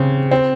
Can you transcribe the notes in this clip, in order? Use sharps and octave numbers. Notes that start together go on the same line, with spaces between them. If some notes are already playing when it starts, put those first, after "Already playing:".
Already playing: C#3 C4
C4